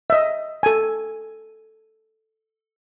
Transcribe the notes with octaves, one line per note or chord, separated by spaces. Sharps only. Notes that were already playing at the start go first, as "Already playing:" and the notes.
D#5 E5
A4 G#5